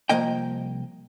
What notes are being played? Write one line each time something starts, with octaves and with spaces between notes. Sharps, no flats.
C2 F2 F3 A#3 D#5 G5